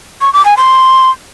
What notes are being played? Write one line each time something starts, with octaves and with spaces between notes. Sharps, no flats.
C#6
D6
G#5
C6